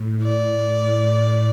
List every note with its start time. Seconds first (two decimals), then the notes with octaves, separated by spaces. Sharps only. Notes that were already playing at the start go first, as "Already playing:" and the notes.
Already playing: A2
0.23 D5